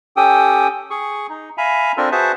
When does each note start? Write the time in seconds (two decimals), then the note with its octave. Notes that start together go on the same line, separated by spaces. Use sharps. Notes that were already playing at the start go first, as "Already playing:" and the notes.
0.17 C#4 G4 A4 G5 D#6
0.91 G#4 C#6
1.29 D#4
1.58 E5 F5 G#5 A#5 B5
1.97 C4 D4 F4 A4 A#4
2.12 F#4 G#4 B4 C5 E5 A5